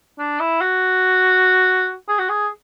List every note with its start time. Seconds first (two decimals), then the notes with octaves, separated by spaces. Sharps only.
0.19 D4
0.40 E4
0.61 F#4
2.08 G#4
2.19 F#4
2.29 G#4